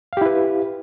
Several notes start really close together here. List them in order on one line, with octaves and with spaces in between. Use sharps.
F5 G4 E4 B4